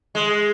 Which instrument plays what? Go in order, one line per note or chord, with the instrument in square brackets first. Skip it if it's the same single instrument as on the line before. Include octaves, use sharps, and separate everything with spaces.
[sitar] G#3